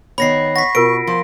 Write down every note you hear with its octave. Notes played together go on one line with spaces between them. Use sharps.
D#3 B3 C#5 B5 A#6 C7
F#5 C#6 A#6 B6
B2 F4 A#4 C5 D7
F3 C6